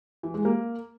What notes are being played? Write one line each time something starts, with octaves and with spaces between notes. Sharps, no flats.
E3
G#3
A#3